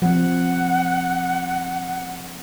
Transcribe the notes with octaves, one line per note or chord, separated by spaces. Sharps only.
F3 C4 F#5